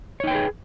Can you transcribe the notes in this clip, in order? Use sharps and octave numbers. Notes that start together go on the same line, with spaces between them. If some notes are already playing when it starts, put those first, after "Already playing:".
D#4 G#4 B4 C#5 G5